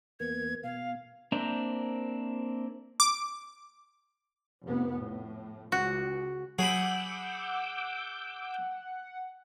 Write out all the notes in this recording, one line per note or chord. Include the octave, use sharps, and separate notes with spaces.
E2 A#3 B3 G#6
B2 F5
A#3 C4 D4 C5 E5 A#5
D6
F1 C3 B3
A2
C#2 F#4
F#3 G#4 F#5 B5 D6 E6 G6